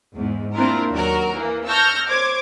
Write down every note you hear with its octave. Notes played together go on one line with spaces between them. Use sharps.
E2 G#2
A#3 C4 D4 E4 F4 A#4
D#2 F#3 F#4 A#4
E3 A#3
A5 C#6 E6 F6 G6 A#6
C5 C#5 D6 G#6